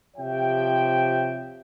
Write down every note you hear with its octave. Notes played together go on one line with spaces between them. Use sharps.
C3 F3 G4 C#5 E5 G5